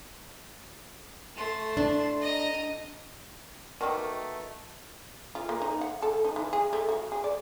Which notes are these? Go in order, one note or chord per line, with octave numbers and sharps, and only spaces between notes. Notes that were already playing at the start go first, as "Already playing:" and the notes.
A3 C6
D4
D#5 A#5
B2 D#3 A3 A#3
F4
A#3
D#4
F#5
A4
D#4
E3
G#4
A3
F#4
G#4
D5